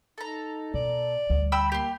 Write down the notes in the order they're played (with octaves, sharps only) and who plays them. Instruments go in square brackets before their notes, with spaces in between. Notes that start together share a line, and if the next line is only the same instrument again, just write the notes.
[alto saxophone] D#4 [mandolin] A4 A#5
[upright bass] B2 [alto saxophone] D5
[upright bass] D2 G3
[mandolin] G5 B5 E6
[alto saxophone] A#3 [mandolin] G4 C6